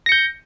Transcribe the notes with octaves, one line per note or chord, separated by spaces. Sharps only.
G6 A#6 C#7